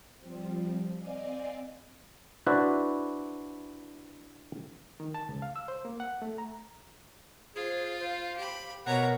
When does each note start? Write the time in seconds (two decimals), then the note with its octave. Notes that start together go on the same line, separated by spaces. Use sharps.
0.19 F3 G3 C4
0.97 C4 D5 D#5 F5 G#5
2.46 D4 E4 F#4 B4 C5 D5
5.00 D#3
5.14 A5
5.29 C#2
5.42 F5
5.56 E6
5.68 C5
5.85 A#3
6.00 F#5
6.22 A3
6.38 A#5
7.56 F4 G#4 C5
8.00 C5 F5
8.37 G4 B5
8.86 B2 A#4 C#5 F#5 A#5